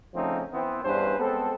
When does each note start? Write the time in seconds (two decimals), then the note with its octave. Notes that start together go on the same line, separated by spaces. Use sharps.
0.15 C#3 F3 A3 C4 C#4 D#4
0.54 E3 B3 C4
0.85 E2 G2 C#4 D4 B4 C5
1.19 G#3 B3 C4 A4